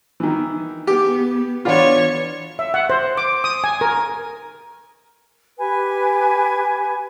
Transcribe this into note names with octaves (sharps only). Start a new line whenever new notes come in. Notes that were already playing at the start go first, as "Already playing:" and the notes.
D#3 E3
B3 G4
E3 B3 D4 F4 C#5
E5
F#5
C5
D6
D#6
G#5
A#4
G4 B4 G#5